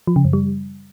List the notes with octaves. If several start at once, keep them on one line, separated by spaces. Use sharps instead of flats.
F3
C#3
F#2
G3